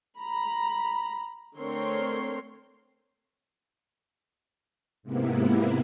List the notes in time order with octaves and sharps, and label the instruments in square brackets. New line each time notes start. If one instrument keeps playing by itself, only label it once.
[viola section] A#5 B5
D3 A3 C4 A#4 C#5 C6
[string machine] G#2 C3 A#3 B3 E4